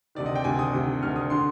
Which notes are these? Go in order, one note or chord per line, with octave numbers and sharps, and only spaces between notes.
D2 C3 D#3 D5
D#5
G5
D2 C3 D#3 G#5
D#6
D2 C3 D#3
D2 C3 D#3 F6
D#6
D3 C6